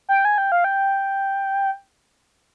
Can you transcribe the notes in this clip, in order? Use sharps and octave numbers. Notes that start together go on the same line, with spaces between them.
G5
G#5
G5
F5
G5